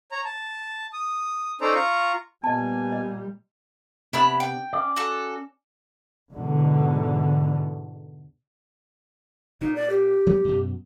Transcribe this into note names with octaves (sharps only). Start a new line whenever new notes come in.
C#5 A#5
A5
D#6
C#4 D#4 A4 C5 D5 A#5
F4 A#5 C#6
A#2 G3 B3 D#5 G#5 A5
D#5
C3 B3 D4 E4 A5 B5
G5
C#4 D5
F#4 A4
E2 G#2 B2 D3
A#2 D#4
D5
G4
F#3 G3 B3
F#2 B2